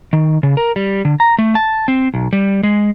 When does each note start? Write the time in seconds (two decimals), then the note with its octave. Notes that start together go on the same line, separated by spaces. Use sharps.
0.13 D#3
0.43 C#3
0.57 A#4
0.76 G3
1.05 D3
1.20 A#5
1.39 A3
1.55 A5
1.88 C4
2.14 B1
2.33 G3
2.63 G#3